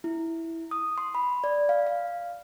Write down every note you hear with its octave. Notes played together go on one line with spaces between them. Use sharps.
E4
D#6
C6
B5
D5
F5
F5